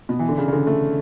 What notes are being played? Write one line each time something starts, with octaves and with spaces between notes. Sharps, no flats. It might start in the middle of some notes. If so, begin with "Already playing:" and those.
B2
E3
D3
C#3
C#3
D3
A3